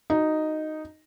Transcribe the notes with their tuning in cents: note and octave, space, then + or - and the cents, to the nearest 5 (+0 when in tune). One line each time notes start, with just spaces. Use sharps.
D#4 -5 F#4 +0